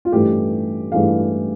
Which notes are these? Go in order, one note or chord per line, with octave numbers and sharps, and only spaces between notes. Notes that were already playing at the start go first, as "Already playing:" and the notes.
F4
A1 G2 E3 A3 G4
A1 G2 E3 A3 F5